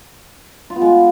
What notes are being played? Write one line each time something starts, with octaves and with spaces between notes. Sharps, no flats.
F4
B3
G#3